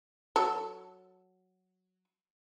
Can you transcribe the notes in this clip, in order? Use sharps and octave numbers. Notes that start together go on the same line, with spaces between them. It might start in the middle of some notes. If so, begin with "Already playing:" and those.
F#3 A4